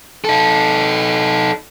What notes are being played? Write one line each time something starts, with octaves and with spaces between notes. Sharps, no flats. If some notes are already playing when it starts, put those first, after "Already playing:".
D#4 A4